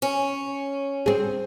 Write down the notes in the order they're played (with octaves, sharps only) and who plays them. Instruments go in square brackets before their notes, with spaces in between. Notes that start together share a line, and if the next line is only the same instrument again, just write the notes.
[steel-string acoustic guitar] C#4
[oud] C4 G#4